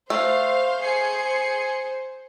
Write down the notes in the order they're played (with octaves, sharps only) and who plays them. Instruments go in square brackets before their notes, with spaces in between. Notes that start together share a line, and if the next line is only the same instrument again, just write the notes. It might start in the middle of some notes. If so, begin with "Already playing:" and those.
[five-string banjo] A3 [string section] C5 [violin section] F5
[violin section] G#4 C7 C#7